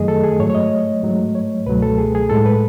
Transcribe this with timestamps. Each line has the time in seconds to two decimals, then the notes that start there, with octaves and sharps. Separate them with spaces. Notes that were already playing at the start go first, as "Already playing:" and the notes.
Already playing: F#2 D#3 F#3 A3 G#4 D#5
0.08 A4
0.24 G#4
0.40 G#2 F#3 A3 C#5
0.50 C#5
0.55 D#5
1.03 G#2 F#3 A3
1.35 C#5
1.66 C#2 B2 F#3 A3 B4
1.83 A4
1.98 G#4
2.15 G#4
2.30 A2 G#3 A4
2.46 B4